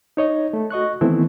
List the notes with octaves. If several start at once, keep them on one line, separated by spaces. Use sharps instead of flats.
D#4 C#5 D#5
A3
F#4 D#5 C#6 F#6
D#3 E3 A3 B3 C4 E4